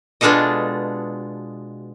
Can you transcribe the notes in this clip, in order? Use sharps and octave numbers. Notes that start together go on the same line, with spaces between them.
B2 G#3 D4 F4 A4 D#5